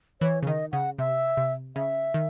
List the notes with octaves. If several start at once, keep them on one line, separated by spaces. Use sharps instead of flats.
E3 C#5
C#3
D#3 D#5
C#3 F#5
C3 E5
C3
C#3 E5
D#3